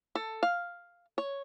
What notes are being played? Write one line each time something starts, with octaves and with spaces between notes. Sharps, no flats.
A4
F5
C#5